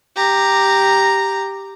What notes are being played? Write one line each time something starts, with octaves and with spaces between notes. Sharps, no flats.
G4 A#5